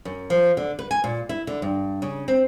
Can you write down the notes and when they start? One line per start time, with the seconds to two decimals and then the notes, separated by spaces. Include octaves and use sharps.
0.05 F#2
0.30 F3
0.57 D3
0.79 B4
0.91 G#5
1.04 A#2
1.29 E4
1.47 D3
1.62 G2
2.02 C#3
2.28 C4